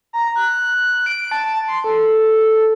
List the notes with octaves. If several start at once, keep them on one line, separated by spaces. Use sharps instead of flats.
A#5
F#6
D7
A5
C6
A4